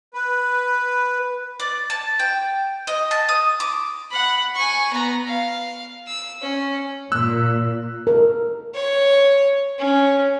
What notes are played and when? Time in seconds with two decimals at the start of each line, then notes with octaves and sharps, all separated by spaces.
0.14 B4
1.60 D5
1.90 A5
2.19 G5
2.87 D#5
3.11 A5
3.29 D#6
3.60 D6
4.10 F#5 B5
4.54 G#5 C#6
4.92 B3 A#5
5.27 F5
6.07 E6
6.42 C#4
7.12 A#2 E6 F#6
8.07 A#4
8.75 C#5
9.79 C#4